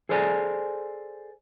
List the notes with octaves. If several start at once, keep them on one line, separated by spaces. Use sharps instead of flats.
G#4 A4 C5 D5 G5 G#5